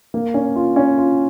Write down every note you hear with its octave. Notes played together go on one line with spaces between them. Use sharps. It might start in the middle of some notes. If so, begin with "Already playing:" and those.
A#3
C#4
F4
C#4
F4